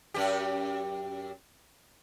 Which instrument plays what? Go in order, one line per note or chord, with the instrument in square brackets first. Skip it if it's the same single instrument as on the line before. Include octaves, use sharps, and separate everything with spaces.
[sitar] F#2 G4